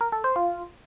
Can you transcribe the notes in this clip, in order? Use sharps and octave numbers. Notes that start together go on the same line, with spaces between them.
A#4
A4
C5
F4